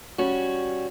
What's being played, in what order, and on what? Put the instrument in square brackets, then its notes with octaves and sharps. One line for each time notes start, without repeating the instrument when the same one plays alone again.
[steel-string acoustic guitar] G3 C#4 F#4